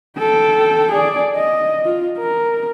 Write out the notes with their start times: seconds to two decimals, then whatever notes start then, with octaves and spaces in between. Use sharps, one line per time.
0.18 A4 G5
0.92 G#4 D5
1.36 D#5
1.85 F4
2.18 A#4